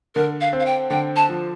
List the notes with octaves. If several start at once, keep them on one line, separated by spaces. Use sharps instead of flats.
D3 A#4
F5
C4
F5
G5
D3 G5
A5
F3